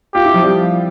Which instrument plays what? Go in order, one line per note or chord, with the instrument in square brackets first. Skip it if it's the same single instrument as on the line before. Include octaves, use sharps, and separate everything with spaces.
[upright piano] F4 [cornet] G4
[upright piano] E4
F3
G3